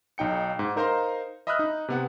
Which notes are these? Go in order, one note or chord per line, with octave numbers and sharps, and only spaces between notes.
B1 D#4 G5 C#7
G#2
D#4 A#4 C5 F5 A#5 C6
D#5 E5 B5 D#6 F6 F#6
D#4
C3 B3 F#5